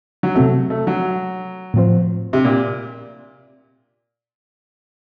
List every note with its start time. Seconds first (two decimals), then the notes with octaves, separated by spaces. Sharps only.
0.23 F#3
0.35 C3 F#3 A3 C4 F#4
0.70 A3
0.87 F#3
1.74 A2 F3 C4 F4 C5
2.33 C3
2.45 A#2